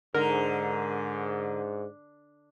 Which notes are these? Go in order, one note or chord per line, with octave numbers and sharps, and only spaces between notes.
G#2 D3 A#4